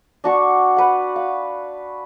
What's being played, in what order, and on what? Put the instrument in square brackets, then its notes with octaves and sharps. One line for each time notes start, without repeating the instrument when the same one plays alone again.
[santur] D4 F#4 C#6
B4 F#5
F5